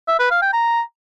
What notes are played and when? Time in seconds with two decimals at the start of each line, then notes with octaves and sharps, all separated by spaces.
0.08 E5
0.19 B4
0.30 F5
0.42 G5
0.53 A#5